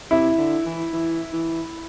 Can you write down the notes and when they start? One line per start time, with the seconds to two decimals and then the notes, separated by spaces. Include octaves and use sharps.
0.11 C3 E4
0.38 D3
0.65 E3
0.93 E3
1.33 E3